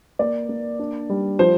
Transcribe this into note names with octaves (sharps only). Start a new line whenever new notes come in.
A#3 D5
A#3
D4
G3
F3 C5